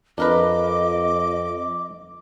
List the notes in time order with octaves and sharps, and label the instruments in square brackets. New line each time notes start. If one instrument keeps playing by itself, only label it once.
[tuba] F2 [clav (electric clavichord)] D4 A#4 B4 [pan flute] D#5 [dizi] D6